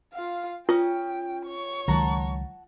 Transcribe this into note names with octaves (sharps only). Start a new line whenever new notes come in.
F4 F5
C#4 F4 G5 D#6
C#5 C#6
C#2 D#3 F#3 F#5 A5 A#5